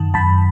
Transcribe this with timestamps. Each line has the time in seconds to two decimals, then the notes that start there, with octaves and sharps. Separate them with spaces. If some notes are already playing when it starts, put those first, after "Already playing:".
Already playing: F#2 D#3 A5
0.14 F#2 A5 B5